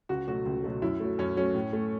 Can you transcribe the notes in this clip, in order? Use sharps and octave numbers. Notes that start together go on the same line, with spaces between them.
C#2 F#4
B2 F#3 A3 F#4
C#2
B2 F#3 A3
F#2 E4
F#3 A3
F#2 C#4
F#3 A3 C#4
A2
A3